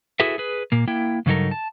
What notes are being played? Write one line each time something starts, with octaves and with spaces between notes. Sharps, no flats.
E4 F#4 G#4 A4 B4 E5
G#4 B4
A#2 A#3
A#3 E4 G5
G2 C#3 F#3 D#4 A4 A#4
A5